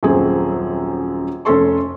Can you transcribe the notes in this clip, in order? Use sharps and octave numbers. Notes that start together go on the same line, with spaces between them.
D#1 F#2 C4 G#4
F1 C#4 A4 C6 C#6